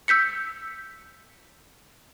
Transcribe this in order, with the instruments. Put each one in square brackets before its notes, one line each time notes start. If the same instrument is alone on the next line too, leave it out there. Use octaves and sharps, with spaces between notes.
[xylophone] E6 G6 B6 C#7